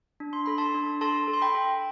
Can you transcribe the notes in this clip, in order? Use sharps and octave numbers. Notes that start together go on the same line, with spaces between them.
D4
C6
A4 B5
A5 C6
D4
A4 A5 C6
A4
C6
G5 B5
A4